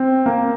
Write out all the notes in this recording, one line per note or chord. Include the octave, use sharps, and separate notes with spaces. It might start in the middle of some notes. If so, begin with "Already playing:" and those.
Already playing: C4
A#3